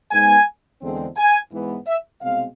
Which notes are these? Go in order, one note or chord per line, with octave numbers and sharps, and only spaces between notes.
G#2 G#3 B3 G#5
E2 D3 G#3 C4
G#5
G#2 E3 B3
E5
C2 B2 G#3 C4 F5